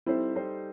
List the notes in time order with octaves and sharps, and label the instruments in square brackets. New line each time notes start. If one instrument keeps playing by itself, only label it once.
[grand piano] G3 D#4 A4 C5 [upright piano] C4 E4
[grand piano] G3 D#4 A4 C5